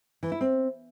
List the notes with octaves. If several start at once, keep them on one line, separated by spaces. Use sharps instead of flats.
E3
E4
C4